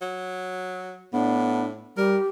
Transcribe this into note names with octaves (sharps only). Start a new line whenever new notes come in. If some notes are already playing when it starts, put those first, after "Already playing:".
F#3
A2 B3 D4
G3 G4 A#4